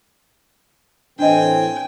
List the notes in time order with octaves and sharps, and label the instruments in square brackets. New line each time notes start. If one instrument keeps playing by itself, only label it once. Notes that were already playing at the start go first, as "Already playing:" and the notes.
[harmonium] A2 E3 C4 [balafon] D4 D#5 [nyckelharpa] G5 G#5